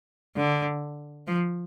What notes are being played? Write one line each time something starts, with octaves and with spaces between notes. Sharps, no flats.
D3
F3